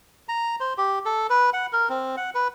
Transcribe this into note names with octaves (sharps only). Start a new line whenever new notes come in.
A#5
C5
G4
A4
B4
F#5
A#4
C4
F#5
B4